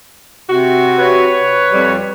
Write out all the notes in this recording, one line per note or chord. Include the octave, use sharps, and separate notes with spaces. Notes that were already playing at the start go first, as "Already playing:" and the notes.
C3 F#4
B4 C#5
F2 G3